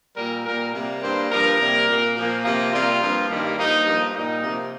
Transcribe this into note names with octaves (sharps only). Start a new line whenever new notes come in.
A#2 G3 A#3 A#4
A#2 G3 A#3 A#4
C3 G3 A#3
G2 G3 A#3 C5
G2 F3 A#3 A#4
C3 G3 A#3
A#2 A#3
A#2 F3 A#3
C3 F3 A#3
C3 G3 A#3 F4
G2 F3 A#3
G2 D#3 G3 A#3
G2 F3 A#3 D#4
G2 F3 A#3
A#2 G3 A#3 D#4
C3 F3 A#3